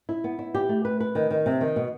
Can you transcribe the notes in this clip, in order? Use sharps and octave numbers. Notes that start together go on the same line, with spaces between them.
E4
B3
E4
G4
A3
B4
B4
D#3
D#3
C3
D#3
B2